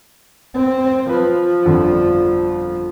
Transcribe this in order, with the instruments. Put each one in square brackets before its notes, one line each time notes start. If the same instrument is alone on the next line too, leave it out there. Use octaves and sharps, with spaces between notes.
[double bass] C4
[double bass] F3 [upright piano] B4
[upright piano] G1 F2 D3